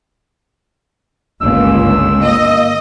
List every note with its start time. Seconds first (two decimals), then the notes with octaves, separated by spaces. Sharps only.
1.41 G1 C#2 A#3 E6
2.23 A#3 D#5